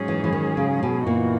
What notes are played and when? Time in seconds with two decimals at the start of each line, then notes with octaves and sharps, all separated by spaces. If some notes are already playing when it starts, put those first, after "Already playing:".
Already playing: G#2 F#3 C#4 G#4
0.08 E3
0.24 E3
0.33 D#3
0.57 C#3
0.83 B2
1.07 F#2 A#2 E3 A#3 D#4 F#4